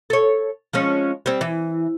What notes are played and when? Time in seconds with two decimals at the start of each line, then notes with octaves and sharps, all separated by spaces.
0.10 A4 C#5
0.73 F3 G#3 C#4
1.26 G3 C4
1.41 E3